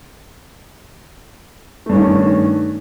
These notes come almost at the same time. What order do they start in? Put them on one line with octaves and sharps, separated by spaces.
A3 G2 C#4 D#3